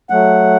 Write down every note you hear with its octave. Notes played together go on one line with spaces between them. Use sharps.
F#3 A3 F#5